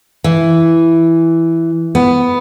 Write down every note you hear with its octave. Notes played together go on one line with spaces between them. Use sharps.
E3
B3